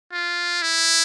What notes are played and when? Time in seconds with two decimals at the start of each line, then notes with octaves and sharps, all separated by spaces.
0.13 F4
0.62 E4